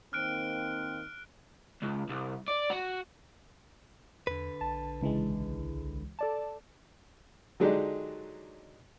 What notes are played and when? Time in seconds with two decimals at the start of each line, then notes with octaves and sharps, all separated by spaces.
0.13 D#3 A#3 C4 F6 F#6 D7
1.82 C#2
2.10 C2
2.48 D5
2.70 F#4
4.27 E2 D3 B4
4.61 A#1 A5
5.01 C#2 E3 G#3
6.19 A4 D5 A5
7.60 D3 F#3 G#3 D4 D#4 G4